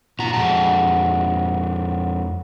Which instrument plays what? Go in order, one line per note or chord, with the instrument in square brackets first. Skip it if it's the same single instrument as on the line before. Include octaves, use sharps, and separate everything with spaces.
[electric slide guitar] A#2 A#5 [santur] F#4
[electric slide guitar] F2 G#3 A5